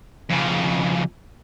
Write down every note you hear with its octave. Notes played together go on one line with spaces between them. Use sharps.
F2 C#3